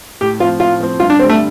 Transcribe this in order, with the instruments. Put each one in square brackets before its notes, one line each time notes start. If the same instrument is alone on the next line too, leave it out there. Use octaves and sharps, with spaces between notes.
[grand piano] A2 [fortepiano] G4
[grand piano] F3 C4 [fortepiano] F4
[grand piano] A2 [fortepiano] F4
[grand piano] F3 C4
[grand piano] G2 [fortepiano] F4
[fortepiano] D4
[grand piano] D3 [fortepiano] C4
[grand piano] G3 [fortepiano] A3